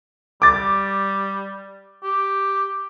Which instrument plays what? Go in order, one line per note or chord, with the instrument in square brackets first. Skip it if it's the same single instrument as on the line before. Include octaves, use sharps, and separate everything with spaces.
[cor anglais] G3 [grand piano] D6 A6
[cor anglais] G4